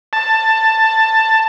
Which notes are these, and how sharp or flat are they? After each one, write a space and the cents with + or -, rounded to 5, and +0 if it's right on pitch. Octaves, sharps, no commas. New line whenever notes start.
A5 +10